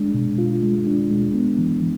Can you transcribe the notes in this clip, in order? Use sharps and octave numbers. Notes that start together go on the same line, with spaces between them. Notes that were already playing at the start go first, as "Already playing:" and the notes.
Already playing: G#3 D4
B2
F4
G#3
D4
G#3
B3
E3
E3